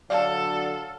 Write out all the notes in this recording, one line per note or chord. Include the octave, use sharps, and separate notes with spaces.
D3 F#3 A4 D5 F5 A5